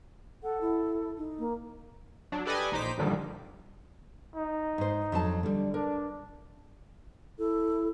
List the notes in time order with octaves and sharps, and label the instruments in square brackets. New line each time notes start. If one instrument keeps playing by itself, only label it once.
[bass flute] A4 [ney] F#5
[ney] E4
D#4
[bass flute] A#3
[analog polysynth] F#3 D4
G4 A4 B4 D5 D#5 G#5
A#1 D#4 C5 D6 B6
G2 A#2 D3 D#3 F3 G3
[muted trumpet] D#4
[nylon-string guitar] G#2 C5
F2 F#3 A5
D3 G3
[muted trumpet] D4 [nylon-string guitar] A#4
[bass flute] E4 [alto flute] A4